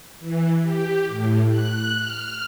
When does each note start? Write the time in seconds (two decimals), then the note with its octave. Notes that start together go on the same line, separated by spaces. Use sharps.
0.19 E3
0.61 G4
1.08 A2
1.50 F#6
1.97 F6